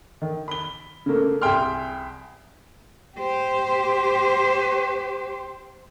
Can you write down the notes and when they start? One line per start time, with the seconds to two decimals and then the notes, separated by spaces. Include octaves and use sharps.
0.22 D#3
0.48 B5 G7
1.06 C#3 A3 A#3
1.42 C2 G#4 E5 G5 C6 F6
3.17 G4 C5